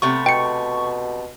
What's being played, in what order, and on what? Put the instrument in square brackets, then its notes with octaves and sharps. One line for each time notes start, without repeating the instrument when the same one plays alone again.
[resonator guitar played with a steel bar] C3 A3 B3 [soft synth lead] C#6
[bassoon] B2 [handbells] G5 C#7